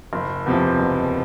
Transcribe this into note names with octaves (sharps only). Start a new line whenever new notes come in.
F#1
E2 C3 F3
F#1